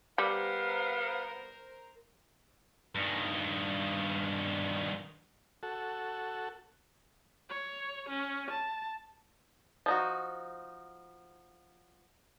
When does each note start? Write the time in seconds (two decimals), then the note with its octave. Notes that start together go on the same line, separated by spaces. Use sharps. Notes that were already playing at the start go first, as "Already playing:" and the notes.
0.18 G3 B3 A#4 C5 F5
2.95 G2 D#3
5.63 F#4 A4
7.50 C#5
8.09 C#4
8.50 A5
9.86 F3 D#4 F#4